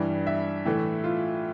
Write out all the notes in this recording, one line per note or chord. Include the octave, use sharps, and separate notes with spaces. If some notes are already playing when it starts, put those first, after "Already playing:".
Already playing: G2 E3 G3
E5
A2 E3 A3
F4